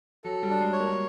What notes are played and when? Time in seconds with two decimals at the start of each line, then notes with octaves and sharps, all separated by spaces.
0.24 F#3 A4
0.43 G3
0.50 D4
0.61 G#3
0.73 C#5
0.79 A#3